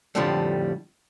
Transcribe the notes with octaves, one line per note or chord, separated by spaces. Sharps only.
F2 A2 D3 F3 G3